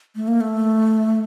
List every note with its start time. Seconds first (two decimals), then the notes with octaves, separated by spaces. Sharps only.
0.15 A3
0.28 A#3
0.41 A3